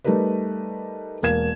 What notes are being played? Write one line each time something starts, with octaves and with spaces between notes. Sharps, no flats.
G3 A3 D#4 G4 A#4 B4
E1 A#3 F5 G#6 E7